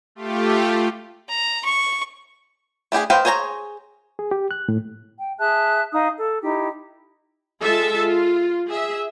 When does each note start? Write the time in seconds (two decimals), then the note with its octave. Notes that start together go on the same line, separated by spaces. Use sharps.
0.15 A3 F4 G4
1.29 A#5
1.65 C#6
2.92 A3 D4 G4 G#4
3.10 B4 C5 D#5 F5 G5
3.25 G#4 C5 C#5 A5 A#5
4.19 G#4
4.31 G4
4.51 F#6
4.69 A2
5.18 G5
5.39 G#4 E5 A5 F#6
5.93 D#4 F5 D#6
6.17 A4
6.43 D#4 E4 G4
7.62 G#3 F4 A4 E5 A5
7.99 F4
8.68 G#4 E5